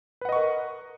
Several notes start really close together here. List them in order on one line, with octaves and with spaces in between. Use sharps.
B4 F#5 D#5 C#6 A#4